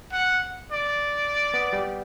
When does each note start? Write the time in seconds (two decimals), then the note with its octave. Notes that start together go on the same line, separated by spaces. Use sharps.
0.12 F#5
0.72 D5
1.54 B3
1.73 G3